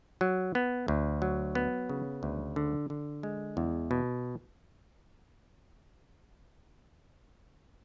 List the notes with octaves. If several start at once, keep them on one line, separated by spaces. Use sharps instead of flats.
F#3
B3
D2
F#3
B3
C#3
D2
D3
D3
G#3
E2
B2